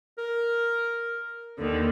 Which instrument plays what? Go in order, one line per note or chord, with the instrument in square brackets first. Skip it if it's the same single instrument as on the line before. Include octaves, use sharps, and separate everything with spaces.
[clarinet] A#4
[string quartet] D#2 D3 D#3